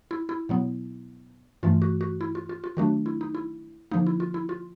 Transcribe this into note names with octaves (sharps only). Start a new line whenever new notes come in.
E4
E4
B2 F#3 B3
G2 E3 A3 F4
F#4
F#4
E4
F4
F4
F4
D#3 F#3 A3 D4 F#4
E4
D#4
E4
D3 F3 A#3 D#4
E4
F4
E4
F4